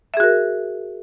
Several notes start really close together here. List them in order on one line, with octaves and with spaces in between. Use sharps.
E5 G#4 F#4 A#4